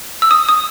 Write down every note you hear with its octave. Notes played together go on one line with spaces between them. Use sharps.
E6
D#6
D#6